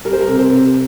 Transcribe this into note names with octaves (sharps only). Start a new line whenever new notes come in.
G3 A#4
C5
A#4
C3
C5
C3